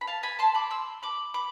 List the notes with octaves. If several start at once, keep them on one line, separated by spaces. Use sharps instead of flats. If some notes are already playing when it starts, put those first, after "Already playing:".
B5
F5 A5
G#5 B5
A5 C6
B5 D6
C6 E6
B5 D6
B5 D6